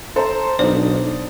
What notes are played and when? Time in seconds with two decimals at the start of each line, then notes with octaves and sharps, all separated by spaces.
0.16 A4 C5 A#5
0.59 B1 D4 D#4 C5